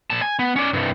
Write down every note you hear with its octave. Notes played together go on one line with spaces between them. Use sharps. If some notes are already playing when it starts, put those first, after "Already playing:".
A#2 A5
G#5
B3
C#4 D5
C2 G2